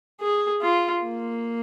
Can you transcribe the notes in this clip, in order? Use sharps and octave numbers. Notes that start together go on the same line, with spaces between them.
G#4
F4
A#3